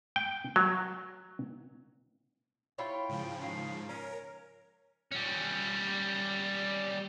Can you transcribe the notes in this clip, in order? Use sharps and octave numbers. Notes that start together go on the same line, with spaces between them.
G5
F#3
E4 F4 C#5 G5
G#2 C#3 F3
D#3 F5
C#4 A#4 C#5
G3 C#4